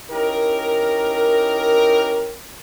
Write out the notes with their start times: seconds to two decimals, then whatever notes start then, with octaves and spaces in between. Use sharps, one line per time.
0.11 C#4 D#4 E4 G4 A#4